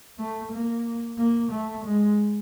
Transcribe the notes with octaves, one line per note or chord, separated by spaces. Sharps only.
A3
A#3
A#3
A3
G#3